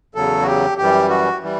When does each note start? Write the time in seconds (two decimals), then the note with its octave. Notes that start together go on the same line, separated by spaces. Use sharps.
0.15 E2 C#3 F#3 A4
0.42 F#4
0.47 G4
0.78 F#2 E3 G3 G4
1.09 F#4
1.42 E3 G3